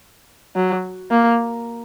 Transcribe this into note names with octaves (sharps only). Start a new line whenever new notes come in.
F#3
A#3